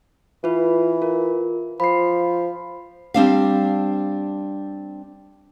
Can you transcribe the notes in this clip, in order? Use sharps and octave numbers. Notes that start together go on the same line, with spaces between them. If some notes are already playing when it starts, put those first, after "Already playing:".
E3 F4 B4
F4 A#4
F3 B5 C7
G3 C4 D4 F5